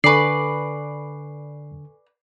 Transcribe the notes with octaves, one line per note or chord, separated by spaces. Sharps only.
D3 A4 B4 D5 G#5 C#6 C7